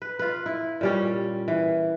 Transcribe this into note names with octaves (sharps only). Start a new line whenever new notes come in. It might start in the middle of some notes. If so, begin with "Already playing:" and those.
B4
F4 B4
E4
A#2 G3 C#4
E3